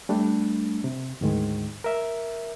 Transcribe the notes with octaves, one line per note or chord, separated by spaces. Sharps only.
G3 A3 D4
C3
D2 G#2 D#3 G#3
A#4 E5